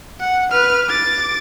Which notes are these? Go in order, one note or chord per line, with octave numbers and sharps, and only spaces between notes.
F#5
B4 F6
D6 A6